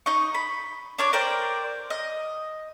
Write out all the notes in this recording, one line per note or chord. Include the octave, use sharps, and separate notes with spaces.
D#4 D#5 C#6
B5
D4 C#5 D6
A#4 C5 D5 G5
D#5